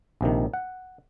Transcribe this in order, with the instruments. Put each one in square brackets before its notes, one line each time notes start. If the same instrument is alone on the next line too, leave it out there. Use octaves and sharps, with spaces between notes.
[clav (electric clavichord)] A#1 C3 D#3
F#5